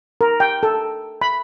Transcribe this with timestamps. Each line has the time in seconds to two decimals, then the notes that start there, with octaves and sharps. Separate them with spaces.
0.21 A#4
0.40 G5
0.63 A4
1.22 B5